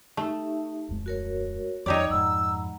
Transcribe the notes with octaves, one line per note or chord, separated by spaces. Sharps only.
A3 D#4 G4 E5
D1 F2 G#3
F#4 A#4 C#5
F2 D#4 G4 C#5 D5 A#5 E6
F2 G#2 F#5 A#5 B5 E6